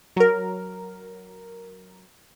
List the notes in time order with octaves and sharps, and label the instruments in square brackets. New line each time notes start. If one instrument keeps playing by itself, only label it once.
[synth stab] F#3 A#4